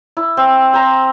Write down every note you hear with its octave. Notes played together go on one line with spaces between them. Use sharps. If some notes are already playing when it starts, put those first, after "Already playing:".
E4
C4
C5 A#5